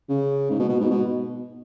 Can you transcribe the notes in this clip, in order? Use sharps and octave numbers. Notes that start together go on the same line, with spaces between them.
C#3
G#2
B2
B2
G#2
B2